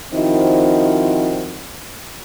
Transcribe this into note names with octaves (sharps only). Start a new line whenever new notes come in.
D#3 F3 C4 D#4 E4 F#4